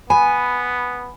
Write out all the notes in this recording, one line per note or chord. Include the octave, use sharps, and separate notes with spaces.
B3 G#5 B5